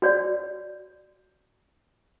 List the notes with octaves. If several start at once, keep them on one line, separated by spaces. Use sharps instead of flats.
F#4 C#5 D5